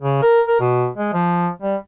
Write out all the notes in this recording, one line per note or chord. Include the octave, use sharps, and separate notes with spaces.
C#3
A#4
A#4
B2
G#3
F3
G3